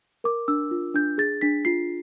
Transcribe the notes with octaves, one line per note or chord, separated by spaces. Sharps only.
A#4 D6
D4 E6
F4
D4 G6
G#4 A6
D4 B6
F4 C7